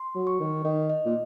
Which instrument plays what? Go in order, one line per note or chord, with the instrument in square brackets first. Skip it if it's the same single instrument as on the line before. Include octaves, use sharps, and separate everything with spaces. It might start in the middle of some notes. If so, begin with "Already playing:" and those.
Already playing: [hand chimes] C6
[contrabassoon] F#3
[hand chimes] C#6
[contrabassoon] D#3
[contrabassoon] D#3 [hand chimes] D#5
[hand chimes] D#5
[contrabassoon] A#2